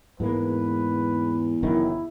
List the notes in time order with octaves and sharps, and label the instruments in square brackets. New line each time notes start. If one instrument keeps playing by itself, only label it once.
[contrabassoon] E2 [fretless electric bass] G#2 G#3 A#3 [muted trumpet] B4
[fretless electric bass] F#1 F#2 D#3 [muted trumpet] E4